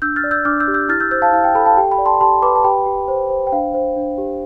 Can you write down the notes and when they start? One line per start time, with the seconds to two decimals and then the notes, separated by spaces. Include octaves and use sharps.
0.02 D4 E6 G6
0.16 F6 A6
0.24 D5
0.31 E6 G6
0.45 D4 D6 F6
0.60 E6 G6
0.68 G4
0.74 E6 G6
0.89 E4 F6 A6
1.00 E6 G6
1.11 C5 E6 G6
1.22 F5 A5
1.33 E4 F5
1.44 G5
1.55 A4 G5 B5
1.66 F5 A5
1.77 G4 G5
1.91 G5 B5
1.98 D5
2.06 A5 C6
2.21 G4 A5 C6
2.42 B4 B5 D6
2.55 A5
2.64 G4 G5 B5
2.86 G4
3.08 C5
3.30 C5
3.47 G5
3.52 D4 F5
3.74 C5
3.96 D4
4.18 G4